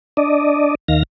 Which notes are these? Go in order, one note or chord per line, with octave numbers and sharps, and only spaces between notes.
D4 D5 D#5
D#2 D#3 F5 A#6